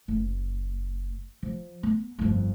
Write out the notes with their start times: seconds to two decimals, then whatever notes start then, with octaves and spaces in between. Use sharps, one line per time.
0.08 F#1
1.43 F3
1.83 B3
2.19 G1 F2